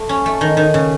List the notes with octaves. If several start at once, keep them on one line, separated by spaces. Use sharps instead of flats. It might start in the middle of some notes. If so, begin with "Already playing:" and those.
Already playing: A3
C#4
A3
D#3
D#3
C#3